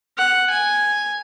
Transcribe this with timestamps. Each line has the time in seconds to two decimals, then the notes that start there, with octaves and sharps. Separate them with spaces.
0.18 F#5
0.50 G#5